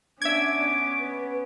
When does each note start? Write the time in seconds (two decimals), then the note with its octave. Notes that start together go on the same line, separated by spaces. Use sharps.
0.22 B3 C#4 D4 E5 D6 G#6
1.00 B4